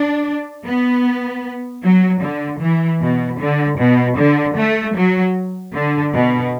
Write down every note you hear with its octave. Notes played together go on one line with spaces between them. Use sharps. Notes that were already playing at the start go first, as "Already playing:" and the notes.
Already playing: D4
B3
F#3
D3
E3
B2
D3
B2
D3
A3
F#3
D3
B2